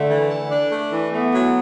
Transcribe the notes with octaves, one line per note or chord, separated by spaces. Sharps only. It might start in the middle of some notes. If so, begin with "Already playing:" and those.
Already playing: D3 A3
E3
A4
D4
A3
E3
A3 B3
F#3